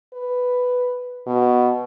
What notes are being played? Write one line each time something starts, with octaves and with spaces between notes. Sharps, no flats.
B4
B2